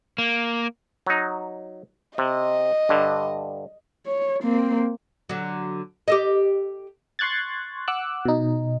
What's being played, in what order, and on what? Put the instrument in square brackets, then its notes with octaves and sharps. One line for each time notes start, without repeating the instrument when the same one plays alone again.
[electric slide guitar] A#3
[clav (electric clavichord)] F#3 D#4
[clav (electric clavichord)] C3 [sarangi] D#5
[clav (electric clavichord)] G2 D3
[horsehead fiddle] C#5
A#3 C4
[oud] D3 F#3
G4 A4 D#5
[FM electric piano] C6 C#6 F#6 G#6 A6
F#5 D6 E6 F#6
B2 D#4